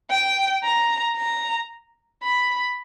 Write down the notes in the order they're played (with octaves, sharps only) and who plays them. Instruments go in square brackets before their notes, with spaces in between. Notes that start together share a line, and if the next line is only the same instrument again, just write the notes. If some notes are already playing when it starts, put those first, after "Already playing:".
[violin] G5
A#5
A#5
B5